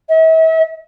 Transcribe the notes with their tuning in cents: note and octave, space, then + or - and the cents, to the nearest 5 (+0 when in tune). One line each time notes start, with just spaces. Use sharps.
E5 -40